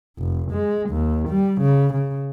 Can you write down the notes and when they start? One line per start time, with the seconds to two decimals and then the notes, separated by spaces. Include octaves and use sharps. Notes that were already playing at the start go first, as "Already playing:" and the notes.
0.19 F1
0.51 G#3
0.90 D#2
1.28 G3
1.61 C#3
1.94 C#3